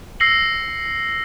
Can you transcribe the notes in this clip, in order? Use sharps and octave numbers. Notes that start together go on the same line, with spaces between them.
E6 A#6 C7 C#7 F#7